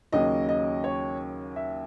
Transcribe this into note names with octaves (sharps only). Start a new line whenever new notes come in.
D#2 C#3 F#3 D#5
D#5
C#5
E5